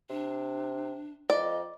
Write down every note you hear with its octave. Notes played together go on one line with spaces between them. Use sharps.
C3 D4
F2 D5 D#5